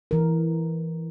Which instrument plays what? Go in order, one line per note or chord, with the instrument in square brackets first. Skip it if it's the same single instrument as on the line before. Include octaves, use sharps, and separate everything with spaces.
[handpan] E3 A#4